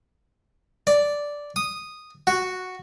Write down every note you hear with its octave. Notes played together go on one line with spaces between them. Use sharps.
D5
D#6
F#4